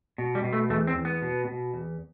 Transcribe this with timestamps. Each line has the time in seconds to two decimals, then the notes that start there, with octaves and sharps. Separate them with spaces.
0.18 B2
0.35 G3
0.44 B2
0.53 A3
0.70 E2 A3
0.87 C4
0.96 E2
1.05 B3
1.22 B2
1.48 B2
1.74 E2